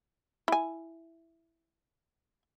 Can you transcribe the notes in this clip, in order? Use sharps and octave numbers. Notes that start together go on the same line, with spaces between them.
E4 G#5